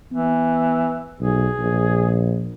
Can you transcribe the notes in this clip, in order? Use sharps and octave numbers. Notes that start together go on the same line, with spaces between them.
E3 B3
B1 G#4
A#1